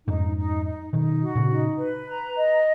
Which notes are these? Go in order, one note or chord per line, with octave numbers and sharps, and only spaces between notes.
F2 G#2 D#4
D#4
D#4
B2 D#3 D#4
F#4
A#2 C#3
D#4
B4
A#5
D#5